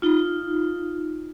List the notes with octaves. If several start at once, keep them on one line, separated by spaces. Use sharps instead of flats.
D#4 F4